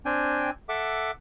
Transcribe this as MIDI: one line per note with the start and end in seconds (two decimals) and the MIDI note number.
0.06 0.50 60
0.06 0.50 62
0.06 0.50 79
0.06 0.50 80
0.69 1.11 69
0.69 1.11 76
0.69 1.11 78
0.69 1.11 86